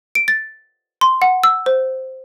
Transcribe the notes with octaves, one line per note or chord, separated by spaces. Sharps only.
D7
A6
C6
F#5
E6
C5